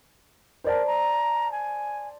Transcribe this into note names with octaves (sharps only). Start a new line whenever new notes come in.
A#4 C5 D5 A5
A#5
G#5